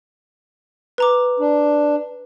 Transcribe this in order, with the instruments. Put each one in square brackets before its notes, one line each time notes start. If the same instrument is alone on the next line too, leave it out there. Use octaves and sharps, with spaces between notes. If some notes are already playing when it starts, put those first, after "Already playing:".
[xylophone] B4 A#5 D6
[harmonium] D4